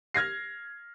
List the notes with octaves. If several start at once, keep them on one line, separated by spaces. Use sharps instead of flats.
F6 G#6 A#6 C7